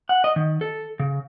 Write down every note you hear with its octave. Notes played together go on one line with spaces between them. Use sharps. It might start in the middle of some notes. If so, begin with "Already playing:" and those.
F#5
D#5
D#3
A4
C#3